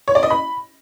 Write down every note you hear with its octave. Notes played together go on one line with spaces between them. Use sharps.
C#5
D5
D#5
B5